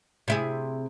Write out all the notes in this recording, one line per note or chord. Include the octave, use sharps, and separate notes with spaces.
C3 E4 G#4